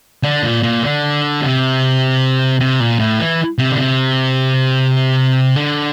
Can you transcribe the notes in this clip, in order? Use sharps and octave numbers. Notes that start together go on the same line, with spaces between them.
D3
A#2
A#2
D3
C3
C3
A#2
A2
E3
C3
D3
C3
D3